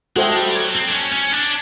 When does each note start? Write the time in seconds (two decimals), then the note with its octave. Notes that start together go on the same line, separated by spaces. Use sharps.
0.16 G#3 F#4 A4 C5 E5 G5
0.36 G3
0.55 F#3
0.74 C4
0.88 D4
0.93 C#4
1.13 C#4
1.33 D4